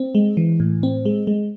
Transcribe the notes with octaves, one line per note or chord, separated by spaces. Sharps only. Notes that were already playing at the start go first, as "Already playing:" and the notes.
Already playing: C4
G#3
E3
A2
C4
G#3
G#3